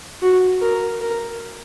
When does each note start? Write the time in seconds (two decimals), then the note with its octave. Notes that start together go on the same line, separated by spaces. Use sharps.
0.22 F#4
0.62 A#4
1.01 A#4